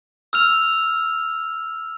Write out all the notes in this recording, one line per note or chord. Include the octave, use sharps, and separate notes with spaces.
E6 F6 F7